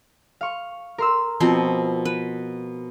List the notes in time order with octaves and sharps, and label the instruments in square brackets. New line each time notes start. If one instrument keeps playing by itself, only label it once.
[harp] F5 C#6
A#4 C6 E6
[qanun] B2 F3 C4
B4